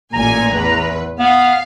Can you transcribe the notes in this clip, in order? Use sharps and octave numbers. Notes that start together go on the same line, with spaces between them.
A1 A#2 G#5 A#5
E2 B4
B3 F5